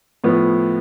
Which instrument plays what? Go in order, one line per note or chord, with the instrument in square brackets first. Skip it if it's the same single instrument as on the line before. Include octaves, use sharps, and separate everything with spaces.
[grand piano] A2 F3 B3